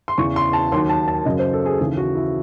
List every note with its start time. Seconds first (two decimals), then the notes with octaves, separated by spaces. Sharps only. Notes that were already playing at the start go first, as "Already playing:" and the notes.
0.08 C6
0.18 E2 C#3 E3 C#6
0.36 C6
0.53 A5
0.72 D#2 D#3 F#3 C6
0.89 A5
1.08 A5
1.25 F#2 C#3 F#3 D#5
1.39 C5
1.53 A4
1.66 G#4
1.79 D#2 C#3 E3 G#4
1.97 F#4
2.15 E4